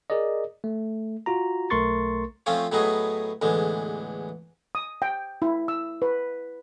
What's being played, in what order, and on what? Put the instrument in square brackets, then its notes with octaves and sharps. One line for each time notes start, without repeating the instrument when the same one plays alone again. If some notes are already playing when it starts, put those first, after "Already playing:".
[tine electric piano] G#4 A#4 D5 D#5
A3
F4 F#4 A#5
B1 A3 A#4 C6 C#6 A6
[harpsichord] F3 A3 C4 C#4 F4
A2 F#3 A3 B3 D#4 G#4
A1 E2 D3 G#3
[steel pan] D#6
G5
E4
E6
B4